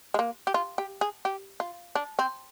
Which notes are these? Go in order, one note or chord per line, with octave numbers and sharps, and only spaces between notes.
G#3
A#3
G4
F4
G4
G#4
G4
F4
D4
C4